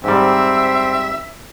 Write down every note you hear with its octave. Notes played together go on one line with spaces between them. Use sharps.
G#2 G3 C4 E5